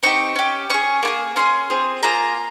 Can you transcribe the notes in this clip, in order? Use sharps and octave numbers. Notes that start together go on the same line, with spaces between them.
C4 D#4 G4 C#6
C#4 G4
C#4 G#4 C#6
A#3 F4 G#4
C#4 G#4 C6
C4 F4 G#4
A#3 F4 G#4 A#5